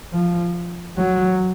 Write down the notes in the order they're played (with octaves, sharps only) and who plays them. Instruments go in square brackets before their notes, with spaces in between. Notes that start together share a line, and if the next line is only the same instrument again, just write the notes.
[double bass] F3
F#3